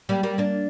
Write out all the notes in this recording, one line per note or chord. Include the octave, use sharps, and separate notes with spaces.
G3 A#3
G3 A#3
A#3 D4